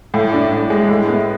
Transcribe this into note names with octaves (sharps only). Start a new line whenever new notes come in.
A2
D4
A2
G#3
A2
B3